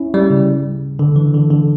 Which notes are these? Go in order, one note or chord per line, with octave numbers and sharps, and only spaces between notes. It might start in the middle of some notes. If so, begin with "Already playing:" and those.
Already playing: C#4 E4
G3
C#3
D3
E3
D3
D3